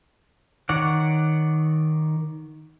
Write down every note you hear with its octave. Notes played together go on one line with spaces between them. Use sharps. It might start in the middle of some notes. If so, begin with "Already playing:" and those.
D#3 C#5 D5 F#5